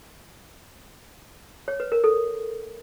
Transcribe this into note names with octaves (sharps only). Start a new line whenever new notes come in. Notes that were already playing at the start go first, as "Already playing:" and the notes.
C#5
B4
A#4
A4